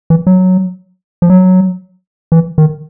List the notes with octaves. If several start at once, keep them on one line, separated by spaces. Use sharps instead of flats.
E3
F#3
F3
F#3
E3
D#3